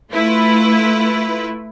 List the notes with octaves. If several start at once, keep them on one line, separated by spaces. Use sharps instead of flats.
A3 E4 F4 B4